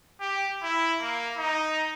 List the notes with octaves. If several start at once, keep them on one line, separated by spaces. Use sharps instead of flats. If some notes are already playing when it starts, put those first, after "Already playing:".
G4
E4
A#3
D#4